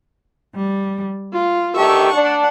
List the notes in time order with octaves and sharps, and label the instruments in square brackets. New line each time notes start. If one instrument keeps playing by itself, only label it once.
[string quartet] G3
F4
[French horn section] D2 D#3 G4 [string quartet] E5 A5 C#6
[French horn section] D4 [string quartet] F#5